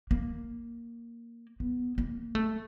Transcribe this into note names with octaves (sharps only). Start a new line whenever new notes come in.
A#3
B3
A#3
A3